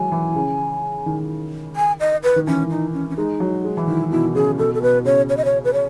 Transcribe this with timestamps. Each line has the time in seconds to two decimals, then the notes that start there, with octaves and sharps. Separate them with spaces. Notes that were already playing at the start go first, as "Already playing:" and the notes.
Already playing: D#3 E3 F#3 G#3 G#5
0.12 E3
0.36 C#3
1.06 D#3
1.76 G#5
2.00 D#5
2.23 B4
2.36 D#3
2.47 E3 C#4
2.70 D#4
2.94 C#4
3.10 C#4
3.17 G#3 D#4
3.40 F#3
3.65 G#3
3.77 E3
3.87 D#3 E4
4.11 B2 E4
4.35 C#3 G#4
4.58 B2 A4
4.74 A4
4.82 B2 B4
5.05 C#3 C#5
5.29 C#5
5.37 D#5
5.45 C#5
5.64 B4
5.73 C#5